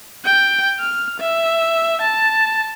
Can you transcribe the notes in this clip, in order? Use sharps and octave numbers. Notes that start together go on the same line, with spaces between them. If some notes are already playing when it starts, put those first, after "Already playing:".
G5
F6
E5
A5